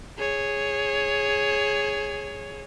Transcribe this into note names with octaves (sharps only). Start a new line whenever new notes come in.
G#4 C#5